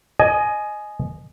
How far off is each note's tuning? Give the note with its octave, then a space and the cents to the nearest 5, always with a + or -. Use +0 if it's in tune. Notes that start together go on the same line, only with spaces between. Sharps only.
D#5 -15 G#5 +20